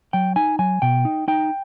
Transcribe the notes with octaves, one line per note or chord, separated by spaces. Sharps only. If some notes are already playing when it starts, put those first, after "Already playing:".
F#3 G5
D#4 G#5
F#3 G#5
B2 G5
D#4
D#4 G5